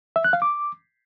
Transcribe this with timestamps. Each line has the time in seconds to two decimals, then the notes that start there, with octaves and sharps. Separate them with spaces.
0.16 E5
0.24 F#6
0.33 F5
0.42 D6